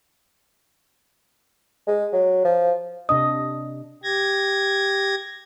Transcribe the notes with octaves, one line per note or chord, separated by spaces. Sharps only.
G#3
F#3
F3
C3 D4 D#5 D#6
G4 G#6 A#6